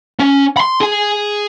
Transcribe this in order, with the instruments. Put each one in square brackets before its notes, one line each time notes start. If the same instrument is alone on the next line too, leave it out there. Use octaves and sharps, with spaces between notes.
[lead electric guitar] C#4
B5 C6
G#4 G#5